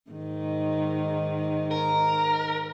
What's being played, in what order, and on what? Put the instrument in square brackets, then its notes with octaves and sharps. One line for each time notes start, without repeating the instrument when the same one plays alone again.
[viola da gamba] G#2 D#3
[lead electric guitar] A#4